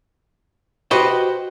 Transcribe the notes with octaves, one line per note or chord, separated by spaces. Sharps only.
F#4 G4 B4 C5 D#5